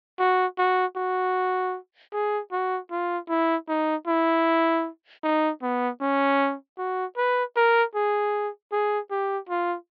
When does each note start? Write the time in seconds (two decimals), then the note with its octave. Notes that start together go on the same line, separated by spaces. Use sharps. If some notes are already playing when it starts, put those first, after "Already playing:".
0.19 F#4
0.59 F#4
0.96 F#4
2.13 G#4
2.52 F#4
2.91 F4
3.29 E4
3.69 D#4
4.07 E4
5.24 D#4
5.62 B3
6.01 C#4
6.78 F#4
7.17 B4
7.56 A#4
7.95 G#4
8.72 G#4
9.11 G4
9.49 F4